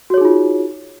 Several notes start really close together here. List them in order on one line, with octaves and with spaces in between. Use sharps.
F#4 C#5 G#4 D#4 F4